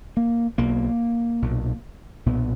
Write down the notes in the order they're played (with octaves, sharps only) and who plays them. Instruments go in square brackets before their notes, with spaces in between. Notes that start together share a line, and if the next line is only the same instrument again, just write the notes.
[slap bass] A#3
B1 B2 A#3
B1 A#2
B1 A#2 B3